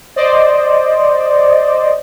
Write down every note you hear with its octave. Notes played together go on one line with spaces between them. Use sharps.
C5 D5 D#5